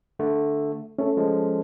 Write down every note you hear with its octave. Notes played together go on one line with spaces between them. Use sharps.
D3 A3
A3 C#4 A4
F3 G#3